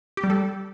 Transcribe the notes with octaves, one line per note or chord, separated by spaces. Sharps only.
G4
G3
A4